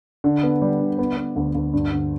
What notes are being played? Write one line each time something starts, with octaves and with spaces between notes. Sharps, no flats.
D3
B3
G3
D3
B3
B3
D2
D2
G2
D3